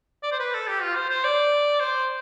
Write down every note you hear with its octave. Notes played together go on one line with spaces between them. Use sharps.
D5
C5
B4
A4
G4
F4
C5
C5
D5
C5